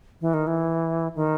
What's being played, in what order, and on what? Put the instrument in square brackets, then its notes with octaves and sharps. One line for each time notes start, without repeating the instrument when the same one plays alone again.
[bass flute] E3
D#3
E3
D#3